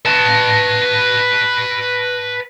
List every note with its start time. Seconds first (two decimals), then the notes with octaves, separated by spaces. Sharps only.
0.06 B4 A5